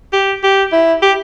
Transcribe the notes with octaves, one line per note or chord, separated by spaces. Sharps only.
G4
G4
E4
G4